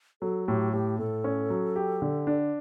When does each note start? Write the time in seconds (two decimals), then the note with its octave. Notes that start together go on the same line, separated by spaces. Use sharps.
0.21 F#3 A4
0.47 A2 G4
0.73 A2 G4
0.98 A2 A4
1.24 C#4
1.50 F#3
1.76 G4
2.02 D3
2.27 D4